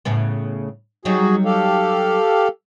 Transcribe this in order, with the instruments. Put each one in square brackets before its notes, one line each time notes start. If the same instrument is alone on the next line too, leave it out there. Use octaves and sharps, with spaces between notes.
[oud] A2 C#3 B3
[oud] F#3 G3 D#4 [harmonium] F#4 G#4
[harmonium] G4 A4 F5